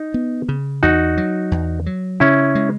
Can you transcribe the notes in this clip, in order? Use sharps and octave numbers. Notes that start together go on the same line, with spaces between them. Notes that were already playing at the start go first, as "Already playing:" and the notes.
Already playing: D#4
B3
C#3
E2 D#4 F#4
F#3
E2
F#3
C#3 C#4 E4
G#3